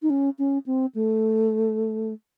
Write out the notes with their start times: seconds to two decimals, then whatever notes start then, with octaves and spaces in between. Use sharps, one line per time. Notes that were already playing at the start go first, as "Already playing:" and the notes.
0.02 D#4
0.10 C#4
0.38 C#4
0.66 C4
0.95 A3